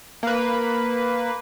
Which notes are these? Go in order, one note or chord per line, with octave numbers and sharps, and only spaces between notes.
A#3 B4